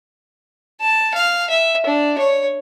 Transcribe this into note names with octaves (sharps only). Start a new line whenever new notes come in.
A5
F5
E5
D4
C#5